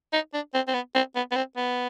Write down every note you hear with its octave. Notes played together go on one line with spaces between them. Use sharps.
D#4
D4
C4
C4
B3
C4
B3
B3
C4
B3